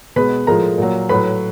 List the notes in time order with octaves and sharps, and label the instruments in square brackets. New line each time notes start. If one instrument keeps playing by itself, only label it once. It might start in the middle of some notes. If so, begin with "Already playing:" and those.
[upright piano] B2 G#3 B4 B5
A2 F3 G#3 A#4 A#5
A#2 F#3
A2 F#3 B4 B5